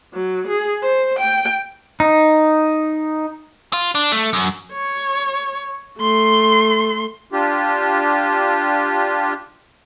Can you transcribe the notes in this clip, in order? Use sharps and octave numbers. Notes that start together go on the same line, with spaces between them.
F#3
G#4
C5
G5
D#4
F4
D4
A3
F#2
C#5
A3 C6
D4 F4 G4